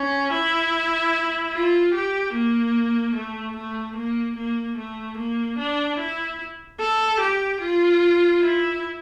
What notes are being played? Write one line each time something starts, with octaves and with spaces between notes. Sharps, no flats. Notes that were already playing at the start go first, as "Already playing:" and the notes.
Already playing: C#4
E4
F4
G4
A#3
A3
A3
A#3
A#3
A3
A#3
D4
E4
A4
G4
F4
E4